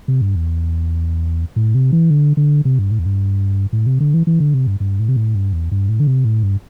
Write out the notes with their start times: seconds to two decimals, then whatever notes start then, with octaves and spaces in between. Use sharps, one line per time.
0.08 C3
0.21 G2
0.36 E2
1.56 A2
1.75 C3
1.92 E3
2.10 D3
2.37 D3
2.65 C3
2.79 G2
2.91 A2
2.99 E2
3.06 G2
3.73 A2
3.86 C3
4.00 D3
4.14 E3
4.27 E3
4.40 D3
4.54 C3
4.67 G2
4.80 G2
4.99 A2
5.09 C3
5.16 A2
5.35 G2
5.53 E2
5.72 G2
5.89 A2
6.00 D3
6.07 C3
6.25 A2
6.43 G2